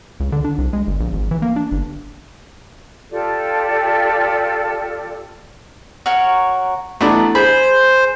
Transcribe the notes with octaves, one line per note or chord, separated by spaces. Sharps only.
C#2
D3
D4
C2
G#3
G1
A#1
G#1
E3
A#3
D4
G1
F4 G4 A4 D5
F#4 A#4 C#5
A3 B3 D4 E4 A#5
G#4 C5 B5